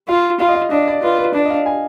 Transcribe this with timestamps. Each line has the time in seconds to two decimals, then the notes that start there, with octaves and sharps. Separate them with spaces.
0.08 F4 F5
0.40 F4 F5
0.48 D#5
0.55 F5
0.71 D4 D#5
0.88 D5
1.03 F4 B4
1.18 B4
1.34 D4 D5
1.45 D#5
1.50 F5
1.66 G#5